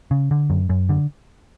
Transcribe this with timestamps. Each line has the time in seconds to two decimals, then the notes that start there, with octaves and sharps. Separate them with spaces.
0.11 C#3
0.31 D3
0.50 F#2
0.69 F#2
0.89 D3